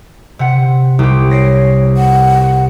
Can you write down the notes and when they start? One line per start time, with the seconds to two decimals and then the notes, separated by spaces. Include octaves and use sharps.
0.39 C3 F#5
0.99 C2 G4
1.31 C#5 A#6 C7 D7
1.97 F#5